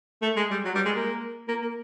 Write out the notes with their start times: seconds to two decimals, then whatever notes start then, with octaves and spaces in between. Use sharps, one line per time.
0.22 A3
0.36 G#3
0.51 G3
0.65 F#3
0.75 G3
0.85 G#3
0.95 A#3
1.48 A#3
1.62 A#3